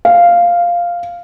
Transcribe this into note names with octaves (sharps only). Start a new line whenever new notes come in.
F5